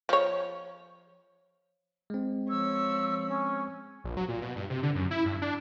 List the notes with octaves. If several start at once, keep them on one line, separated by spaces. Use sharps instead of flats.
F3 C#5
G#3 C4
F3 C#5 E6
C#4
A#1
F#3
A#2
B2
G2
C3
D3
F#2
E4
G2
D4